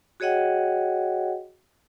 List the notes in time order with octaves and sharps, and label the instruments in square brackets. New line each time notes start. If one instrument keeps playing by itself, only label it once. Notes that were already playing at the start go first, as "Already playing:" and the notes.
[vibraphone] F#4 G#4 C#5 D#5 F#5 G5